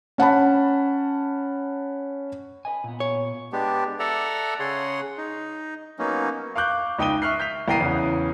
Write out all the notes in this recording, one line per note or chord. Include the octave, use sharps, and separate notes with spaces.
C#4 F#5 A5 B5
B4 D#5 G#5
A#2 B3
C#5
G#3 B3 D4 G4
A4 D5 E5 F#5 A#5
C#3 G#4 C#5 F#5 C6
D#4
F#3 A#3 B3 C#4 D#4
F5 C#6 D6 F#6 G6
C#2 D#4 G5 D#6 D#7 G7
E5 C#6 F6 F#6 C7
G6 B6 F7
C2 E3 G5 A#5 C7 D#7
E2 C#3